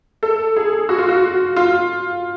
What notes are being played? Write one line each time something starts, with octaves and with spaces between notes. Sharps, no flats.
A4
G#4
F#4
F4
F#4
F4